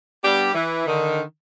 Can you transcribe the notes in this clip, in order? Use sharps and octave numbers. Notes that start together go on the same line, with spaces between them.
G3 B3 D4 G4
E3
D3 D#3